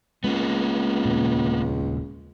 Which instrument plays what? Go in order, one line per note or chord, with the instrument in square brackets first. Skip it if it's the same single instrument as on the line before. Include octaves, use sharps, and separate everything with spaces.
[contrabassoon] C#2 [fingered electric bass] G#3 [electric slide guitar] A#3 B3
[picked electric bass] D#1 A#2 C#3